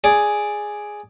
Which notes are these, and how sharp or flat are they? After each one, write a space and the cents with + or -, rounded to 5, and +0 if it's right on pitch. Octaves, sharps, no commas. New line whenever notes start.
G#4 +0 D5 +0